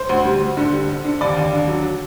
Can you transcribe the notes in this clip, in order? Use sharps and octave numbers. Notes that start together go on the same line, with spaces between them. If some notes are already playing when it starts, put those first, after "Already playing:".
Already playing: C5
D2
G3
D2
D3
G3
D3
D3
D#2 D5
D#2
D3
F#3